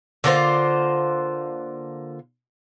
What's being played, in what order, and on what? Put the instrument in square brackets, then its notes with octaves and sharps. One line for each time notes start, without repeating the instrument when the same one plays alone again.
[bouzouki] D3 A#3 F4 C5